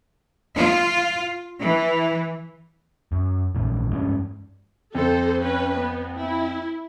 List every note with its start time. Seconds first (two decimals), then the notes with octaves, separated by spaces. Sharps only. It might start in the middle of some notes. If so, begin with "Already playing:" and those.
0.56 F4
1.60 E3
3.12 F#2
3.55 A#1 G#2
3.91 G2 G#3 C#4
4.95 F2 A4 C5
5.41 C#4 B4
5.77 B3
6.17 E4